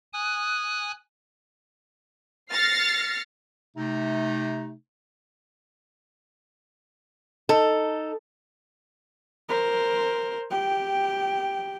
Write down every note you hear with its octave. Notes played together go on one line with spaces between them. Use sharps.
G#5 D#6 F#6
F6 A6 A#6 C7 C#7
C3 A3 D#4
D#4 A4
A#4 C5
G4 G5